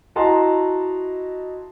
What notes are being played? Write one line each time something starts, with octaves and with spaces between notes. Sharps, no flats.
E4 F#4 D#5 A5 A#5 C6